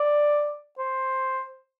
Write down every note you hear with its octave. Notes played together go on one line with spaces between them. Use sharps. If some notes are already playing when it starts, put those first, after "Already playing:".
Already playing: D5
C5